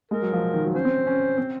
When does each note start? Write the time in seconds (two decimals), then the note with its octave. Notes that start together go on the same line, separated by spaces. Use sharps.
0.11 G#3 A#4
0.22 F#3
0.33 F3
0.54 D#3
0.65 F#3
0.75 C#4 C5
0.85 C4
1.07 C#4
1.38 C4